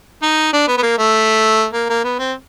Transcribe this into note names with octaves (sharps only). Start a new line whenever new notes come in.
D#4
D4
B3
B3
A#3
A3
A#3
A#3
B3
C4